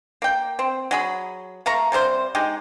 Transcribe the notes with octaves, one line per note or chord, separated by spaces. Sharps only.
A#3 G5
C4
F#3 G#4 B5
A3 F5 A#5 C#6
C3 G3 C#4 C5
G#3 D#4 G4